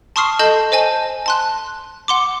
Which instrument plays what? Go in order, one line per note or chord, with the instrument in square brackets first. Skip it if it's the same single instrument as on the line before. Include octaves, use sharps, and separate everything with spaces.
[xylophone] A5 C6 C#6 D#6 F6 C7
A4 D#5 A5 G6
C5 D#5 G#5 A5
A5 C6 F#6
F#5 C6 D6